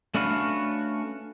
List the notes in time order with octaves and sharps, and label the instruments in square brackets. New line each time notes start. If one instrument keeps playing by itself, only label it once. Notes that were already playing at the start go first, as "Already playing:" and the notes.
[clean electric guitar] A3 C#4 D4 F#4 B4 F5